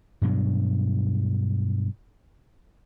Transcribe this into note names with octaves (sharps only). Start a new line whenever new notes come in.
G2 B2 F#3 D4